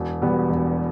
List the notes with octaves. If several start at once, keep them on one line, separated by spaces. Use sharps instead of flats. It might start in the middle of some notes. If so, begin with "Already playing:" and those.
Already playing: E1
E2 B2 G3 B3
E1